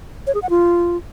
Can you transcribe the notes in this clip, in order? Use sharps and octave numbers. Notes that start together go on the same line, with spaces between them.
C#5
G#4
F#5
F4